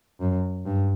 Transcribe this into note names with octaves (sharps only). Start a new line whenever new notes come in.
F#2
G2